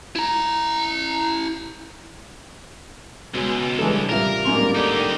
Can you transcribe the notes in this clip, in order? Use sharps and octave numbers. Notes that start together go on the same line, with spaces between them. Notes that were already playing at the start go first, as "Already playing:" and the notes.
E4 A#5
C#2 B2 G#3
G2 E3 G3 G#3 A4
A1 C3 G3 F4 A#4 E5
D1 G#2 G3 A#3 C#4 C6
D3 D#4 G4